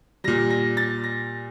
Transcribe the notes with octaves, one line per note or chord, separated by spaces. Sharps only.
A#2 G3 A#6
A#6
A6
A#6